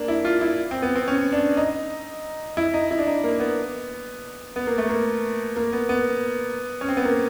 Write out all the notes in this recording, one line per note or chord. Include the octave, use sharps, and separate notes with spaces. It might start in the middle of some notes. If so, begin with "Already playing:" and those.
Already playing: A#3 D4
E4
F4
E4
C4
B3
C4
C#4
D4
D#4
E4
D#4
E4
D4
D#4
A#3
B3
B3
A#3
A3
A#3
A#3
B3
B3
C#4
C4
B3
A#3